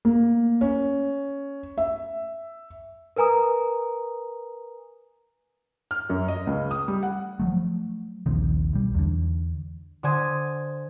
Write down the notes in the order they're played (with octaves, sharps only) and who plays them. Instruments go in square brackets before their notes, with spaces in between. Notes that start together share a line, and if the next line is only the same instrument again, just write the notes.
[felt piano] A#3
C#4
E5
[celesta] A#4 B4 G#5 A#5 D#6
[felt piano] F6
F#2
D#5
C#2
D#6
G3
F#5
[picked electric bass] F3 F#3 A3
D#1 A#1 C3 D#3
B1 G3
E2 D3
[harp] D3 C5 G#5 D#6